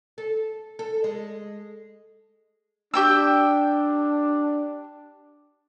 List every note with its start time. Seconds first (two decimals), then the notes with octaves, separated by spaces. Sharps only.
0.18 A4
0.79 A4
1.04 G#3
2.94 D4 G4 G5 E6